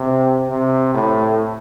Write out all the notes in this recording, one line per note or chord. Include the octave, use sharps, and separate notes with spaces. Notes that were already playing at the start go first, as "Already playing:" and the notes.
Already playing: C3
C3
A2